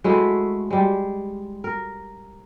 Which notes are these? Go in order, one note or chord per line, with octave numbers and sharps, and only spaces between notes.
G#3 A3 E4 F#4
G3 G#3
A#4